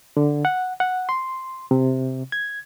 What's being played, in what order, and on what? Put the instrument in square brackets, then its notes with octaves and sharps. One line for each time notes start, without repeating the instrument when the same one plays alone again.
[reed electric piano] D3
F#5
F#5
C6
C3
G#6